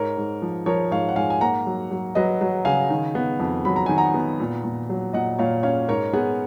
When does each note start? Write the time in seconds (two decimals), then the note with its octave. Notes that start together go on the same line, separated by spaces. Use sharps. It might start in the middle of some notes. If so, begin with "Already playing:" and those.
Already playing: G#2 A#4 C#5
0.17 G#2
0.42 F3
0.66 F3 A#4 C#5
0.91 G#2 C#5 F5
1.09 F#5
1.16 G#2 F5 G#5
1.30 G#5
1.41 A#3 F#5 A#5
1.67 F#3
1.91 F#3
2.15 F#3 B4 D#5
2.41 F#3
2.65 C#3 F5 G#5
2.90 D#3
3.15 B3
3.40 F2
3.65 F#3 B5
3.76 A#5
3.86 D#3 G#5
3.97 F#5 A#5
4.14 B3
4.40 A#2
4.64 A#2
4.89 F#3
5.13 A#2 D#5 F#5
5.39 A#2 C#5 F5
5.63 C#4 C#5 F5
5.89 G#2 A#4 C#5
6.13 B3 G#4